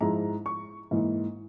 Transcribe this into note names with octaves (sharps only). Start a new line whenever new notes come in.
G#2 F3 G#3 E4 A#5
C#6
G#2 E3 A#3